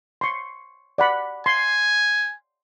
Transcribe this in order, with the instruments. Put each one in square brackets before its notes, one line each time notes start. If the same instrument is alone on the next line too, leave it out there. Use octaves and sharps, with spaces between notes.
[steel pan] C6 C#6
D5 F#5 B5
[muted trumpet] G#5 [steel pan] C6